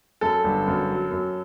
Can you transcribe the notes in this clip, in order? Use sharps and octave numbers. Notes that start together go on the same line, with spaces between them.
F#2 A4
G1
F#2
F#3
F#2